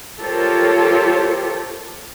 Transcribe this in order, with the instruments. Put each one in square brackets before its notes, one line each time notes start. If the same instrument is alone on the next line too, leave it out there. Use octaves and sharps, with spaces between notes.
[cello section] F4 G4 A4 A#4 C5 C#5